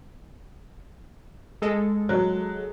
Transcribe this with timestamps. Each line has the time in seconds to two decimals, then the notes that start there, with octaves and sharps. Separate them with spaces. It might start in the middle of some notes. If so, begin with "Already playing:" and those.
1.62 G#3 A4
2.09 F#3